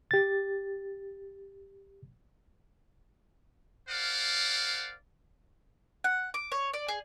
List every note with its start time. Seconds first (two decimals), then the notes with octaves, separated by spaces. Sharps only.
0.11 G4 A6
3.89 A#4 C5 D5 F5 F#5
6.04 F#5
6.34 D6
6.52 C#5
6.73 D5
6.88 G#4